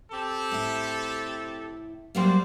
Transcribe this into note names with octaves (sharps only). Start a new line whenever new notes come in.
C4 G4 A4
A2 E4
F#3 G3 A#3 F#4 C5 D5